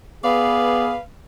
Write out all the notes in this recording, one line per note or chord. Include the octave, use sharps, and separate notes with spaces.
B3 G#4 B4 D5 F5